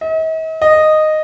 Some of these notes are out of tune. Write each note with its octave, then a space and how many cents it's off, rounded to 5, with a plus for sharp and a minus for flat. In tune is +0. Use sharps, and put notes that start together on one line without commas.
D#5 +45
D#5 -10